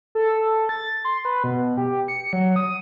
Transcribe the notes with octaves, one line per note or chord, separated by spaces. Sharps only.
A4
A6
C6
B4
B2
G4
C#7
F#3
D#6